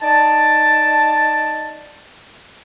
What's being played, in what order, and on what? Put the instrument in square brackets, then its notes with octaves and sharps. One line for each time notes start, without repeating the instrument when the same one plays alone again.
[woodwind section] D#4 D5 A5